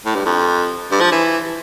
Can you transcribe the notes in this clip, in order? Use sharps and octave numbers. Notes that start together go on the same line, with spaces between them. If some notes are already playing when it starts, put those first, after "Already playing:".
A2
G2
F2
G2
F3
E3